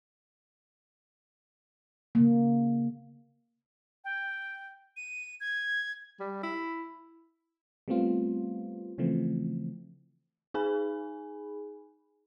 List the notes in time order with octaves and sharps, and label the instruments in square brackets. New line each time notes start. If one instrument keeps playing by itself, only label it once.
[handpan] C#3 A#3
[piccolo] G5
D#7
G#6
[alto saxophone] G3
E4
[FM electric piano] G3 A3 B3 C4 F4
C#3 E3 F3 A3 C4
[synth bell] D#4 G#4 G#5 B5